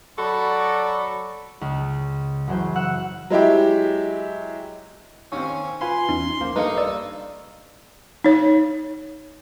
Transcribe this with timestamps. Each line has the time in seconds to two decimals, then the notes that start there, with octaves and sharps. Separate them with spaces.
0.19 F#3 F#4 A4 D5 B5
1.61 C#2
2.47 F#1 E3 F#3 C5
2.75 F#5 E6 F#6
3.30 F#3 G#3 E4 G4
5.32 D#2 C4 C#4 C#6
5.81 F4 B4 F5 G#5 B5 C6
6.09 E2 C#4 D#4
6.41 A#1 A#3 C5
6.56 G2 A3 A#3 D#4 B4 C#7
6.78 D5 E6
8.24 D#4 C#5